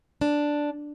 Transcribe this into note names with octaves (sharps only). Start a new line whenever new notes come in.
D4